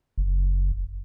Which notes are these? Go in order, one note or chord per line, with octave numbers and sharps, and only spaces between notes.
F#1